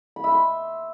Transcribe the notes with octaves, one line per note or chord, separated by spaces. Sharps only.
B5
E5
C6